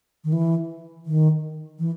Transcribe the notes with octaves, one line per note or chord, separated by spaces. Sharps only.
D#3
E3
D#3
E3